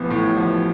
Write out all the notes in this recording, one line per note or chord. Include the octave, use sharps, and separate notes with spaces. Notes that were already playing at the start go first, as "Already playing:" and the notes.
Already playing: A1 F3 B3
A2
F3